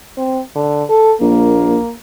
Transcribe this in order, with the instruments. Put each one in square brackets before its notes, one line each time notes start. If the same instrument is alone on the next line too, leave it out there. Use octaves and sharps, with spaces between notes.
[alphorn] C4
D3
A4
[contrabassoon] A#1 [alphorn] A#3